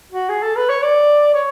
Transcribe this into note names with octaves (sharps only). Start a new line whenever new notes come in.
F#4
G#4
A4
B4
C#5
D5
C#5